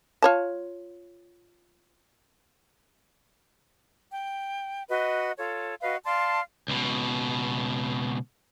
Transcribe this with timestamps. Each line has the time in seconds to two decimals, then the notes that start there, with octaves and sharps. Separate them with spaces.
0.22 F4 C#5 A5
4.11 G5
4.89 F#4 B4 D#5
5.38 F4 A4 C#5
5.81 F#4 B4 D#5 F5
6.05 D5 F5 A5 C6
6.68 C#2 B2